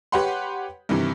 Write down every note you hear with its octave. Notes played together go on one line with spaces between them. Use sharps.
G4 B4 C#5 F#5 B5 C6
G2 C3 D#3 E3